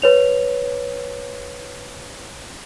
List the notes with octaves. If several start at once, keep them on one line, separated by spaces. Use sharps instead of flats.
B4 C#5 F7